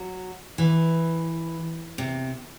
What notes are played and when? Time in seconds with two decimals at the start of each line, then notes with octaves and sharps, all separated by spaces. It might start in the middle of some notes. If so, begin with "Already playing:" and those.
Already playing: F#3
0.58 E3
1.98 C3